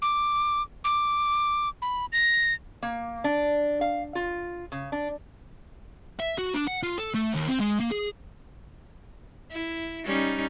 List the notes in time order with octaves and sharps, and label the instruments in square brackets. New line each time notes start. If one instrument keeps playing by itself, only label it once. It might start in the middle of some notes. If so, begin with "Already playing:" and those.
[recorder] D6
D6
B5
A#6
[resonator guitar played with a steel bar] A#3
D4
F5
F4
C#3
D4
[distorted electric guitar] E5
F#4
D4
F#5
F4
A4
A3
D#2
C4
G#3
A#3
G#4
[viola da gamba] E4
G3 C#4 D#4